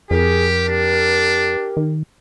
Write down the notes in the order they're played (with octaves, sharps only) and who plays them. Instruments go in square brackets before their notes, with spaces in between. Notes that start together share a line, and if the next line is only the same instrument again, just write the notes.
[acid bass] F2 [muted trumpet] G4 [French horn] G#4 [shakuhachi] A#4
[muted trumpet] D4 [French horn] G4
[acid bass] D#3